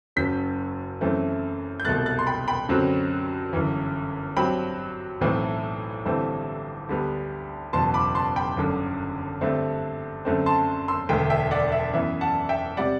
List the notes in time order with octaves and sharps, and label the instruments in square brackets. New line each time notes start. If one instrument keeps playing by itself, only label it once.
[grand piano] F#1 F#2 F#3 G6 B6
F#2 E3 A3 C4
G6
C2 B2 A3 F#6 A6
F#6 A6
C6
G5 B5
G5 B5
F#2 D3 F#3 C4
G1 F#2 E3
G2 F#3 C4 G5 B5
B1 A2 E3 A3 C4
G1 G2 E3 A3 C4
D2 D3 G3 B3
F#1 E2 B2 A5 C6
B5 D6
A5 C6
G5 B5
G1 F#2 D3
G2 D3 A3 C4
F#2 D3 A3 C4
A5 C6
C6 E6
E1 D2 D3 A3 E5 G5
E5 G5
D5 F#5
E5
F#2 E3 B3 E5
F#5 A5
E5 G5
C3 G3 D5 F#5